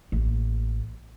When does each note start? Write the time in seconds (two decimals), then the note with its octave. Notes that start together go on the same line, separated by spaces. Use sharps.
0.12 A1 A#3